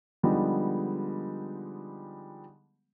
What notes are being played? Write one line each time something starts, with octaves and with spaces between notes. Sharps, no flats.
D3 F3 G3 G#3 B3 D#4